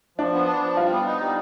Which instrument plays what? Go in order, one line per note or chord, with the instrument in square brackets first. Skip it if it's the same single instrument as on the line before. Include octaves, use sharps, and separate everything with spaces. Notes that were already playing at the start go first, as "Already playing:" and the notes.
[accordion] F3 [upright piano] D4
[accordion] B3
D4
F3
[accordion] G3 [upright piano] F4
[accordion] B3
D#4
G3